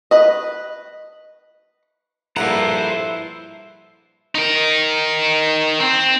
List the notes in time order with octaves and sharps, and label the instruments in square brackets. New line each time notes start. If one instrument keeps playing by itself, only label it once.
[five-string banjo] B4 D#5
[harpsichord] A#1 G2 F#5 [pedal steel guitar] E4 A4 B4 [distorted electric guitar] C5 A#5
[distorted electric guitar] D#4 A#4
C4